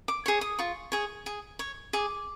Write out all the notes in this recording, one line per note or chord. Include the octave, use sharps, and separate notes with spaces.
D6
G#4 C#5
D#6
F4 C#6
G#4 C#5
G#4
C#5
G#4 D6